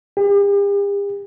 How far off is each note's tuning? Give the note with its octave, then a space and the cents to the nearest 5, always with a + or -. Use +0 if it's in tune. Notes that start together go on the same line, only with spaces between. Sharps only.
G4 +45